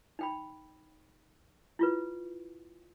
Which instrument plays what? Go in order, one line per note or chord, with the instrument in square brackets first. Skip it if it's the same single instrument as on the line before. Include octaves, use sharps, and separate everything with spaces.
[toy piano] D#4 G5 B5
E4 F4 B4